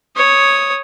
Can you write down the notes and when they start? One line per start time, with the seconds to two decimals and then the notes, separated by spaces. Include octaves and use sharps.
0.16 C#5 D#6